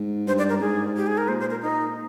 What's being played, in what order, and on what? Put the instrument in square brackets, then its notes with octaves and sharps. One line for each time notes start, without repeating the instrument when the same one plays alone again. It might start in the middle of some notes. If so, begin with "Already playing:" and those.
Already playing: [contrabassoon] G#2
[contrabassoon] G2 [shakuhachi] C5
[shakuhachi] D5
A#4
[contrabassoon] G#2 [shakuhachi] G#4
[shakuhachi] G4
G#4
A#4
[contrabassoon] A#2 [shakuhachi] C5
[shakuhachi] C5
A#4
D#4